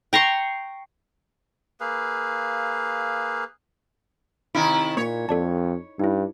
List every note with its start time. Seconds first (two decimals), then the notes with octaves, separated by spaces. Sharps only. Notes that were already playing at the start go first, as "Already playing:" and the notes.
0.13 G5 A#5 C6 C#6
1.80 A#3 G#4 B4 F5
4.55 C3 D#3 E4
4.97 A#2 A#3 C#5
5.29 F2 A4 D5 A5
6.00 G2 D#4 E4